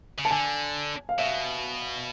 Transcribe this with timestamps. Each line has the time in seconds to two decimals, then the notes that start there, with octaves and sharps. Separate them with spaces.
0.19 C#3
0.25 A5
0.30 D3 G#5
1.09 F5
1.19 B2 E5